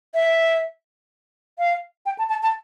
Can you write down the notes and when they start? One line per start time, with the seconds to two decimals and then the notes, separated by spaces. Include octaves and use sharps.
0.15 E5
1.59 F5
2.06 G5
2.19 A5
2.30 A5
2.43 A5